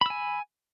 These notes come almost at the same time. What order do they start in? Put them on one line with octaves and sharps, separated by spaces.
B5 E6 G#5